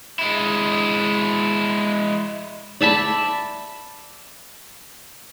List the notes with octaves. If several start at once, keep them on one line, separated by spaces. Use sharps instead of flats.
G#3 E4
D5 E5 A5 B5